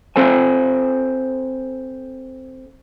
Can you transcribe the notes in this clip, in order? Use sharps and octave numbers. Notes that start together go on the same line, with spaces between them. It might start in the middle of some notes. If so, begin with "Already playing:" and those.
C4 A4 C5 G#5